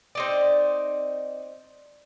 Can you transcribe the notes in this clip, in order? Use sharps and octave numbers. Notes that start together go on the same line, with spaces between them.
C4 D#4 D5